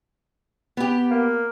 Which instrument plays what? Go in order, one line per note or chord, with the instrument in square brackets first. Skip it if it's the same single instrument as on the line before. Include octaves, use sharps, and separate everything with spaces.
[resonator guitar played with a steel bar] B3 G4
[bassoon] A#3